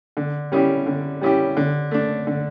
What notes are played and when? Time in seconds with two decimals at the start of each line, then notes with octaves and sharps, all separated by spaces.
0.17 D3
0.52 G3 C#4 E4 G4
0.86 D3
1.21 G3 C#4 E4 G4
1.57 D3
1.91 A3 D4
2.27 D3